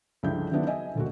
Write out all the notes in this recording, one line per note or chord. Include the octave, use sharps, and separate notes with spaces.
C#2 G2 D3 F3 E4 G6
D#3 E3 F#3 B3 D4 E4
D#5 E5 G#5
E1 D2 A3 A#3 F#4